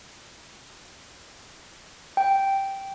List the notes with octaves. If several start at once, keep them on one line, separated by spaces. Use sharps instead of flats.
G5